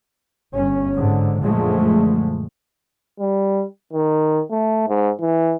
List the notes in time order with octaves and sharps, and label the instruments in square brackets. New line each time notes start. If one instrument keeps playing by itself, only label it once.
[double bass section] G1 C#4
G#2 D3
F#2 A#2 D3 F3 G#3 A3
[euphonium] G3
D#3
A3
G#2
E3